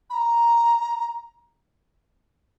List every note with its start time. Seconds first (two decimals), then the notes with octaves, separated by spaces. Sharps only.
0.10 B5
0.13 A#5